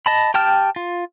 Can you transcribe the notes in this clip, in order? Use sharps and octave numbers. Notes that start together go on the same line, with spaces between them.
D#5 A5 B5
G4 G5 A5 F6
F4